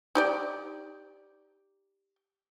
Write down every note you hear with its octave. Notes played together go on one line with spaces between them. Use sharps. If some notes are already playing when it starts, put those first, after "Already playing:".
D#4 G4 D5